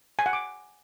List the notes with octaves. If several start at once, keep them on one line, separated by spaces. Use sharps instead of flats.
G#5
F#5
D6